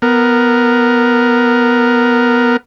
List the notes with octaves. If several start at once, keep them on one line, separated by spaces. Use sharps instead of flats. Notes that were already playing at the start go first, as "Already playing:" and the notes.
B3 A#4